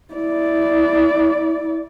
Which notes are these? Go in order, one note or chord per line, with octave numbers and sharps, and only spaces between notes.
E4 D5